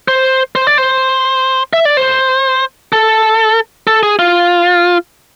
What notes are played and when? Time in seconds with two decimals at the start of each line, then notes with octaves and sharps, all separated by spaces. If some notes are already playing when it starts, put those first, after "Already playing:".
0.08 C5
0.55 C5
0.67 D5
0.78 C5
1.73 E5
1.85 D5
1.97 C5
2.93 A4
3.87 A4
4.03 G#4
4.19 F4